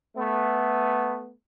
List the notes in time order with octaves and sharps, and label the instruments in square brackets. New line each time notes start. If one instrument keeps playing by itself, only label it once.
[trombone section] A3 B3